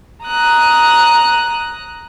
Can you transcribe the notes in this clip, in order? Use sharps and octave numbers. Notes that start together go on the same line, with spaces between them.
A#5 D#6 F#6